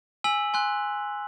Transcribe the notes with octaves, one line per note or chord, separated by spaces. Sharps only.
G#5 E6 B6 F#7
G#5 C6 F#6